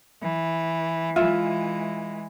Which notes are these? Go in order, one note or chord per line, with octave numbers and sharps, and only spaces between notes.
E3
E3 G#3 F4 E5